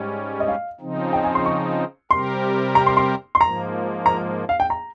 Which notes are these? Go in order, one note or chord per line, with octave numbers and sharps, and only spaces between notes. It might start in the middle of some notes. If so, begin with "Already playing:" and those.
Already playing: G#2 G3 C#4
D#5
F5
C#3 F3 C4 D#4
G5
G#5
C6
C#6
C3 G3 C4 G4 A#4 C6
A#5
C6
C6
C6
G#2 F3 A#3 A#5
A#5
F5
G5
A#5